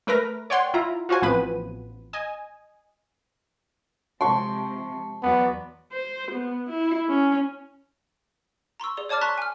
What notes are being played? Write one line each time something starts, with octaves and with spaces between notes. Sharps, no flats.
A3 A#4 B4 A#5 A#6
C#5 D5 F#5 G5 C6
E4 F4 A#5
F4 F#4 C5 G#5
A1 F3 B3 C4 B4 D#7
D#5 G#5
C3 F3 G#3 A5 C6 C#6
E2 F#3 B3 D5
C5
B3
E4
C#4
A#5 C6 C#6 E6
G#4 D5 G7
C#5 D5 A5 D6 F6 A6
A5 A#5 C6 C#6 F#6 B6
G#5 F6